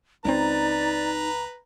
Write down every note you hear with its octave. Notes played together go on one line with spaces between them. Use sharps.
C#2 F3 C4 D#4 B4 D5 A#5